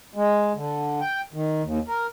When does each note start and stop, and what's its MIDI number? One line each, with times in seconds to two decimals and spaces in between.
0.15 0.53 56
0.55 1.00 50
1.00 1.21 79
1.34 1.62 51
1.63 1.79 39
1.88 2.07 70